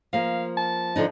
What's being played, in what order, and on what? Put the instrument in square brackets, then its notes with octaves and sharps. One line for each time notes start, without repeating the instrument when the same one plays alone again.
[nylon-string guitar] F3 A#3 [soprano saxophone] F5
[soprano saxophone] A5
[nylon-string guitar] D3 F3 D#4